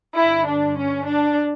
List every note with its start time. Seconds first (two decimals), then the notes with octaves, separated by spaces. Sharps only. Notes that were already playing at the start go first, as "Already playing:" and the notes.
0.17 G2 D3 E4
0.47 D4
0.78 C#4
1.08 D4